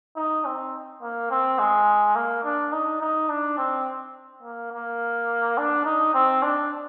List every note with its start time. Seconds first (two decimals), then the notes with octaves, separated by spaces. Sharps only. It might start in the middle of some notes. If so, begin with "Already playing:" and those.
0.17 D#4
0.45 C4
1.02 A#3
1.31 C4
1.59 G#3
2.16 A#3
2.45 D4
2.72 D#4
3.01 D#4
3.29 D4
3.58 C4
4.43 A#3
4.73 A#3
5.58 D4
5.86 D#4
6.14 C4
6.43 D4